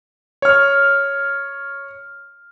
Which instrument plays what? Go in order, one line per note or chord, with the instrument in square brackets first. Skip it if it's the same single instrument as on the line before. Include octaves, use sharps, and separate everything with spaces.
[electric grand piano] C#5 F6